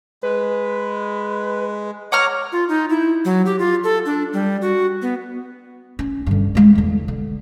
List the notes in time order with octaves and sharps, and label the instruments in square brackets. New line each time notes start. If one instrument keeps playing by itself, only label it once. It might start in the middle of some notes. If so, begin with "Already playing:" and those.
[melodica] G#3 [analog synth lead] B4
[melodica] C#5 D6 [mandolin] F#5 A#5 F6
[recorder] F4
D#4
E4
F#3
G4
F4
A4
D4
G3
F#4
B3
[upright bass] C#4
G2 D3
G#3 C4
E2 D3
D3